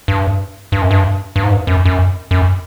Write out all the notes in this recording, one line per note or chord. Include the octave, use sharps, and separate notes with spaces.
G2
G2
F#2
G2
G2
G#2
G2
F#2
F#2
F#2